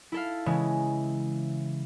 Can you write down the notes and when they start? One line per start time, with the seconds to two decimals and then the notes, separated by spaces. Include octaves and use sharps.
0.12 E4 A4 F5
0.46 C#3 E3 G#3